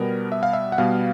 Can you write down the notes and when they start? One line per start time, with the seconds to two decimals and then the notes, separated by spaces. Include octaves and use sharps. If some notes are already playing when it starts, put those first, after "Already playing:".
Already playing: B2 G3 B3 A#4
0.32 E5
0.43 F5
0.53 E5
0.72 F#5
0.78 B2 G3 B3 F5